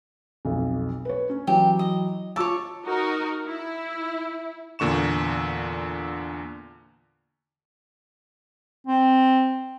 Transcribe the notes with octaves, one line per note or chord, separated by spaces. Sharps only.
B1 F2
B4 C#5
C#4
E3 F#3 G4
D#5
F4 C#5 A5 D6 E6
D#4 F#4 A#4
E4
E2 A#2 D3 C#6 E7
C4